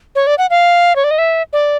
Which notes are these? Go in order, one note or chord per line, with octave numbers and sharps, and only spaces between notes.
C#5
D5
F#5
F5
C#5
D5
D#5
E5
D5